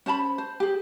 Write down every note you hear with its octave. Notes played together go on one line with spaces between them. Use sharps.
C#4 C5 A5 B5
C5
G4 G#4